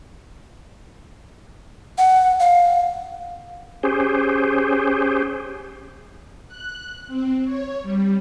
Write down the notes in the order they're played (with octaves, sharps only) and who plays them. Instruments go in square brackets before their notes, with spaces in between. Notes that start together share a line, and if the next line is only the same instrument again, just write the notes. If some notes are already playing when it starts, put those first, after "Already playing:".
[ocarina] F#5
F5
[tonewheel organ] C#4 G4 G#4 C5
[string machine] F#6
C4
C#5
G3